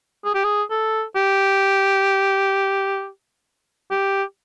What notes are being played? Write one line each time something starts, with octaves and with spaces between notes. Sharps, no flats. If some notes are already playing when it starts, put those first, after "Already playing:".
G#4
G4
G#4
A4
G4
G4